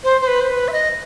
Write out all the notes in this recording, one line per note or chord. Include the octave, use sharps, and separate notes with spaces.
C5
C5
B4
C5
B4
E5
D#5